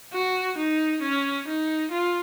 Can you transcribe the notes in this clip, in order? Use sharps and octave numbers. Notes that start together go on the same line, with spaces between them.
F#4
D#4
C#4
D#4
F4